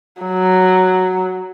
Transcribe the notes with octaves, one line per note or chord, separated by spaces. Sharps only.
F#3